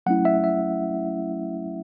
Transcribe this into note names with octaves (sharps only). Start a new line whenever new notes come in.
F#3 A3 C#4 E4 F#5
E5
E5